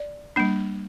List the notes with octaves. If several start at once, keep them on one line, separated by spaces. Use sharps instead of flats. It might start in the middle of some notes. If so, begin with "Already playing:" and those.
Already playing: D5
G3 A#3 D4